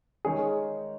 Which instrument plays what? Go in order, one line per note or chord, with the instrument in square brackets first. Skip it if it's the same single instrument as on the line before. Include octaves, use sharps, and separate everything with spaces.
[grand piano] D#3 G#3 D#4 A#4 C#5 [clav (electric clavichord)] G#4